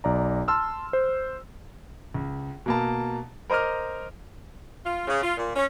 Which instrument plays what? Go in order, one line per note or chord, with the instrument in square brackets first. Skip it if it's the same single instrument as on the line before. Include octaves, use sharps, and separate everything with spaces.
[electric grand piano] B1 D5 A#5
A5 C6 E6 F6
C5
[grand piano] C#2
B2 A#3 A5
A#4 C5 D#5 D6 F6
[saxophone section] F4
C#3
F4
A#2
C#4